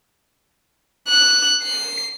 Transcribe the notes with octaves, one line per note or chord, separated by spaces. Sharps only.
F#6
C7